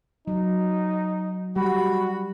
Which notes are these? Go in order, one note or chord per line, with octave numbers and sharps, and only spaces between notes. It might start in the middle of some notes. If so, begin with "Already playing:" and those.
F#3 D#4
G3 F#4 B5